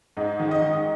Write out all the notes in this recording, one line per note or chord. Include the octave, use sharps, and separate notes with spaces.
G#2 D#5
D#3
D#5
D#3